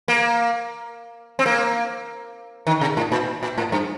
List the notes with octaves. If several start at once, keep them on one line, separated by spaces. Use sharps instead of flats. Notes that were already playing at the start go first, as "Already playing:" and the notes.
A#3
C4
A#3
D#3
C3
A2
A#2
A#2
A2
G2